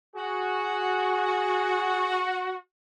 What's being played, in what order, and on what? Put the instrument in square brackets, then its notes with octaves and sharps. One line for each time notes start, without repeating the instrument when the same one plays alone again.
[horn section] F#4 [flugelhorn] G#4